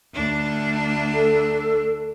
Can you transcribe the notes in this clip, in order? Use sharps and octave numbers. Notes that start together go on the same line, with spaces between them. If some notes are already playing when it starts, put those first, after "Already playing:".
D2 D4
A4